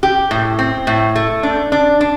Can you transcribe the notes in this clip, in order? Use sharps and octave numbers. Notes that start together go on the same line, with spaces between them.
G4
A2
C4
A2
A3
D4
D4
D4